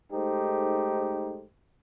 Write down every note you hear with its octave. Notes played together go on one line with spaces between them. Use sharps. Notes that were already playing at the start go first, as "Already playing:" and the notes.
G#2 A3 D#4 G4 A4 C5